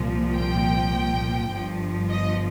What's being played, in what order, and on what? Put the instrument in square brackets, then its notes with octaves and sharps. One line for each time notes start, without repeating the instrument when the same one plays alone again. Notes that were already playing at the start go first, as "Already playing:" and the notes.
Already playing: [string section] C2 A#2 F3
G5
G1 G2 F3
D#5